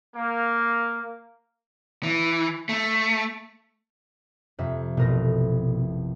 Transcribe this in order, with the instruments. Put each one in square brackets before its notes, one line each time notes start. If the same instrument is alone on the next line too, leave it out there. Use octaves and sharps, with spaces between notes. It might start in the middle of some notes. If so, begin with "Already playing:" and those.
[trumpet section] A#3
[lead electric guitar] E3
A3
[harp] F2 C3 E5
[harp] A1 A#4 A#6 [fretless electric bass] B2